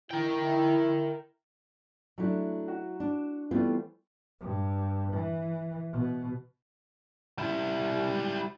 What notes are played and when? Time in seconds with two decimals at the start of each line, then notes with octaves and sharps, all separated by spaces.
0.11 E4 A#4 G5
2.18 F#3 A3 D4 E4
2.68 F#4
3.00 D4
3.51 E3 G3 A3 B3 C4 F4
4.40 G2
5.13 E3
5.92 B2
7.38 G3 E4